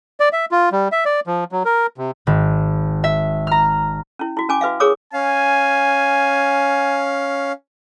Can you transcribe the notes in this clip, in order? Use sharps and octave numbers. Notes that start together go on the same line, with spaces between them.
D5
E5
F4
G3
E5
D5
F3
F#3
A#4
C3
G#1
E5
A#5 F6
C#4 E4
E4 F#4
C#4 G#5 D6
F#4 B4 E5 F5
G#4 A#4 C#5 D6 D#6
C#4 F5 G#5